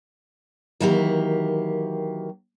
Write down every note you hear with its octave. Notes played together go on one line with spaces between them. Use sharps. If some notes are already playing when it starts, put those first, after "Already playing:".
D#3 E3 F#3 A#3 F#4 G4